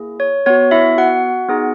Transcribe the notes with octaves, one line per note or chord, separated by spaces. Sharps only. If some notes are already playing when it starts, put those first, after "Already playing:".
Already playing: A#3 E4 G#4
C#5
B3 F#4 C#5
E4 E5
F#4 F#5
B3 D#4 G#4